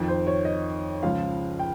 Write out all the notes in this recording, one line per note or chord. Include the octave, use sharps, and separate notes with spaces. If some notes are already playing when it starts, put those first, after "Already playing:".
Already playing: F2 D#3
C5
C#5
D#5
C#2 C#3 F3 F5
G5